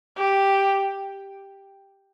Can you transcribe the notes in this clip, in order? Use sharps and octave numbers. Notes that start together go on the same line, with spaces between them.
G4